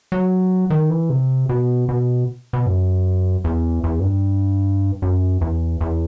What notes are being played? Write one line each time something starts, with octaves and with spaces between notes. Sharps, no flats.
F#3
D#3
E3
C3
B2
B2
B2
F#2
E2
E2
F#2
G2
F#2
E2
E2